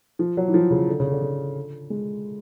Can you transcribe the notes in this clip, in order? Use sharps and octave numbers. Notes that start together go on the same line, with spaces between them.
F3
F#3
E3
F3
C#3
D3
C#3
D3
D3
G#3